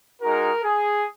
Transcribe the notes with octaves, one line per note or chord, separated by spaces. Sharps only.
G#3 D#4 F#4 A#4
G#4